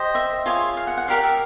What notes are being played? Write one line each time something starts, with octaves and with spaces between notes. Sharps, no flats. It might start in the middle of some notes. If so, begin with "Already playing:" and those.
Already playing: G4 C5 D#5
E5
F4 G#4 C#5
F5
F#5
F#5
G4 A#4 D5 F5
E5